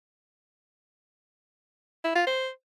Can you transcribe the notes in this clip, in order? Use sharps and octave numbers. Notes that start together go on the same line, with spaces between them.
E4
F4
C5